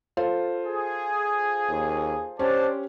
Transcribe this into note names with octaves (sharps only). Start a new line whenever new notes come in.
F4 A4 C5
G#4
D#2
C#4 D4 G4 C5 D5 A5